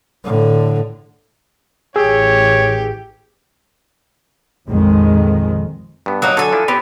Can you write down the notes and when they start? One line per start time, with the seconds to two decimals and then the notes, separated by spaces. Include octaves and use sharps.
0.24 A2 D3
1.96 A1 E3 G4 G#4 C#5 E6
4.67 A#1 F2 D#3 G#3
6.06 G2 B3
6.22 F#3 A#3 D#4
6.37 D3 F#3 A4 G#5
6.53 F3 D4 E4
6.68 B3 C4 G4